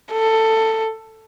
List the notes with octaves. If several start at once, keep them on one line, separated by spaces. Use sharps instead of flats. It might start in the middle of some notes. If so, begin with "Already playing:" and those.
A4